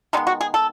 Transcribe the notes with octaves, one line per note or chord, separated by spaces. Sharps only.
D#3 G#3 B3 D#4
F#4
G#4
A4